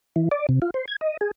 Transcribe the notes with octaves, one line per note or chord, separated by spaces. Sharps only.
E3
D5
C3
F4
C5
G#6
D#5
G#4